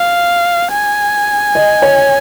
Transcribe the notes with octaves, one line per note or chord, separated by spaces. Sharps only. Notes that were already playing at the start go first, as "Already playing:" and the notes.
Already playing: F5
G#5
D#5
C#5